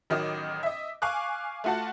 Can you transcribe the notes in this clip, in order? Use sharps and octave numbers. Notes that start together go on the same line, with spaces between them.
A1 D#3 F#3 D#5 D6
D#5 E5
F5 G#5 C#6 D6 F#6
A3 F4 F#4 F#5 A5